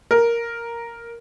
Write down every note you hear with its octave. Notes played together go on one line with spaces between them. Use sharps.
A#4